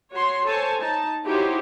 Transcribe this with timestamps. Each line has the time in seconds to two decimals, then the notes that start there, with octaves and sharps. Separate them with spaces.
0.14 F#4 C#5 C6
0.46 A4 C5 C#5 G#5 A5
0.81 D#4 A5
1.25 D#4 E4 F#4 G4 C5 C#5